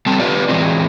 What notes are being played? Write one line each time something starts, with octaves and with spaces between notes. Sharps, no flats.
G3 C4 A4 A5
F4 G4 B4 D5
E3 F#3 G#3 C4